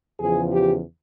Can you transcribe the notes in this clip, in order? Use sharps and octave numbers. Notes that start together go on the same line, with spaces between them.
E2 C#3 F3 G#4
G4